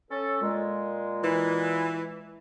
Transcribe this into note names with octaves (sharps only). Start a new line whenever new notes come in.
C#4 A4
A#2 G#3
E3